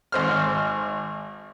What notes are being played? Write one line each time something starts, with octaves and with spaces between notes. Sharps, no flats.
G#1 C5 F6